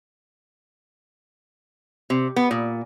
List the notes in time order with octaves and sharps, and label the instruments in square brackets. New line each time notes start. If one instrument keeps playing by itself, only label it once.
[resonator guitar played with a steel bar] C3
B3
A#2